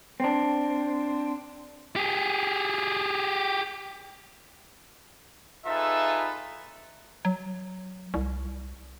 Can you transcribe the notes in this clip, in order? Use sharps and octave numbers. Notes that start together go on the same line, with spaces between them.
C4 D4
G4 G#4
D#4 F4 G#4 A4 B4 E5
F#3
C2